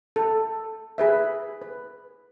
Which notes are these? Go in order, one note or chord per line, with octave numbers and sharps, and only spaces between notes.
A4
G#4 B4 E5
B4